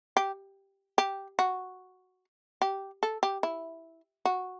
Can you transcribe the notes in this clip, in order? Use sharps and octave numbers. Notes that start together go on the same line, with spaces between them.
G4
G4
F#4
G4
A4
G4
E4
F#4